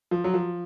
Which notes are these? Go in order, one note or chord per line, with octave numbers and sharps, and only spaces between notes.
F3
F#3
F3